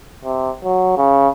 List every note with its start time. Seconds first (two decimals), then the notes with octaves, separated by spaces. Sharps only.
0.24 C3
0.64 F#3
0.97 C#3